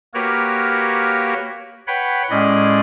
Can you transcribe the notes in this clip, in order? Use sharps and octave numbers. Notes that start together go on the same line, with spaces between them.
A#3 F#4 G4 A#4 B4 C#5
B4 C#5 F#5 G5 B5
A2 G#3 C#4 D5 D#5